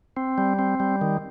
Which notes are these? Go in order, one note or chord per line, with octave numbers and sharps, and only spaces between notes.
C4
G3
C4
G3
D#3